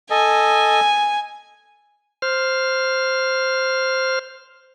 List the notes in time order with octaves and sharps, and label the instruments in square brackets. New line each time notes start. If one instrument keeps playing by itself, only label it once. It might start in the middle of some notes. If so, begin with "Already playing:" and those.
[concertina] A4 D#5 [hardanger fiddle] G#5
[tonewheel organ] C5 F6